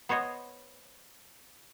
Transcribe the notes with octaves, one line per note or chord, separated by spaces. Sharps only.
B3 C5 C#5 D#5